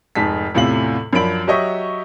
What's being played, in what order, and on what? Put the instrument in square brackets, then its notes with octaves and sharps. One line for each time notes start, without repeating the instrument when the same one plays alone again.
[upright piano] F1 G#2 G#3 A5 B6
E2 A2 C3 F4 F5 F#7
F#2 F3 D4 B5 D7 F#7
F#3 G4 C#5 D#5 E5 C#6